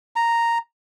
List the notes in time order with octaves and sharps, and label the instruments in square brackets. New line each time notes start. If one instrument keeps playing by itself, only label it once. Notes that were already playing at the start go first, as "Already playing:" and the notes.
[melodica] A#5